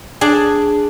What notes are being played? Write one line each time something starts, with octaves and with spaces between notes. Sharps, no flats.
D4 G#4